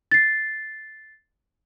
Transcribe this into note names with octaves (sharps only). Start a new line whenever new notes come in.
A6 C7